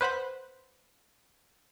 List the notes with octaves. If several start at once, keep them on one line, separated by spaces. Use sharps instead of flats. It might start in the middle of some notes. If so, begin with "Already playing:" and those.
B4 C5 F#5 B5